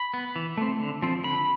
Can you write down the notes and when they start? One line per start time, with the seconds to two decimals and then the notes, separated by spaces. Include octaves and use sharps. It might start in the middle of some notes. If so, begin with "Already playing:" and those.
Already playing: B5
0.14 B3
0.36 E3
0.57 A3 C4
0.80 D3
1.02 F3 C4
1.24 D3 B5